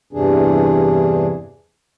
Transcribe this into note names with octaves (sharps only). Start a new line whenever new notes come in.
E2 G2 C3 E3 D4 G#4